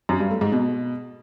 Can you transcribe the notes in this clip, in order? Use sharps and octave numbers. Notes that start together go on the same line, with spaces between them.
F#2
G2
A3
G#2
B2